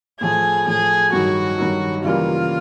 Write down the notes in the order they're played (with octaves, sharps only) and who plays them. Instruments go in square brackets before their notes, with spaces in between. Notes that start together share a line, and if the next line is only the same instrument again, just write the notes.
[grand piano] A2 F3 A3 [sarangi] G#4
[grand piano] A2 F3 A3 [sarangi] G#4
[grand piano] G2 D#3 F#3 [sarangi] F#4
[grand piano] G2 D#3 F#3
[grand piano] C#3 E3 G3 A#3 [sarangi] F4